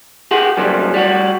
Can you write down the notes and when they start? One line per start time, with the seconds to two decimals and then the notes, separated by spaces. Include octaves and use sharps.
0.31 G4 G#4 F#5
0.57 F#2 C#3 F#3 G3 C4
0.94 G3 F#4